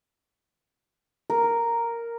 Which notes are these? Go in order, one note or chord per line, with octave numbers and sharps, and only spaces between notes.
A#4